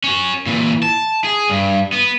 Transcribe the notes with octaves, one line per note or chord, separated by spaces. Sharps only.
C#4 F#4
A#2 E3
A5
G#4
G2
B3